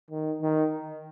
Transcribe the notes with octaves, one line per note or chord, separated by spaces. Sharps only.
D#3
D#3